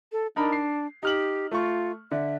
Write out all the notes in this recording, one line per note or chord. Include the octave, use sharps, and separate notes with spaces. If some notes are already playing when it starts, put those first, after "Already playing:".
A4
D4 D#4 A#4 B5
C7
D#4 G4 F6 F#7
A3 F4 C#6
D3 E5